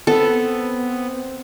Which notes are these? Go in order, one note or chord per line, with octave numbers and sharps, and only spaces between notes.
B3 C4 A4